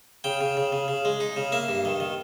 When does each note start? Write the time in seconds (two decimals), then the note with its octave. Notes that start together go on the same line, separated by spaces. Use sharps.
0.24 C#3 G5
0.41 C#3
0.57 C#3
0.73 C#3
0.88 C#3
1.05 G#3
1.20 D#4
1.37 C#3
1.52 A#3 E5
1.69 G2
1.85 D#3
2.00 D#3